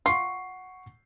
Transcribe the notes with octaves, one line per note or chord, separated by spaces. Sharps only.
F4 F#5 C#6 C7